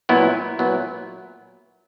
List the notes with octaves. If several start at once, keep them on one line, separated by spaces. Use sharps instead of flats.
A#2 F#3 B3 E4
A#2 F#3 B3 E4